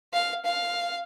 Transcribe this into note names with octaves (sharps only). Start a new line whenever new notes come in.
F5
F5